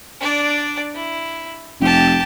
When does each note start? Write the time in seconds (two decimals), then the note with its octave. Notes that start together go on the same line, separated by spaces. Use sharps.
0.20 D4 D5
0.94 E4
1.81 F1 G4 A5